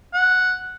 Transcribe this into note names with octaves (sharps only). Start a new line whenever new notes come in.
F#5